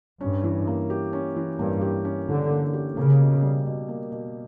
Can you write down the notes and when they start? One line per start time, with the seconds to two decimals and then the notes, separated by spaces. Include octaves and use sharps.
0.21 G2 C#4
0.44 E3
0.67 A#3
0.90 G4
1.13 C#4
1.36 E3
1.59 G2 A#3
1.81 G4
2.05 C#4
2.28 D3 E3
2.51 A#3
2.74 G4
2.97 C#3 A#3
3.20 B2
3.42 G3
3.66 B2
3.89 A#3
4.12 B2